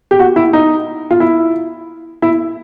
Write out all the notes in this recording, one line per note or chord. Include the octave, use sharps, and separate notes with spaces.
G4
F#4
E4
D#4
F4
E4
E4